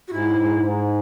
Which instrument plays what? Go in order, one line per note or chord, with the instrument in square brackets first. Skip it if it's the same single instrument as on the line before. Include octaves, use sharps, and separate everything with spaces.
[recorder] F#4
[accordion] G#2 [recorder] E4
[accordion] G#2
G#2